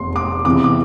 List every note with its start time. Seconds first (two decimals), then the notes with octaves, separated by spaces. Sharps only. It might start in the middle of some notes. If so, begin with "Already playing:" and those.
Already playing: F1 E2 C6
0.16 D6
0.45 E2 C3 E3 D6
0.64 D6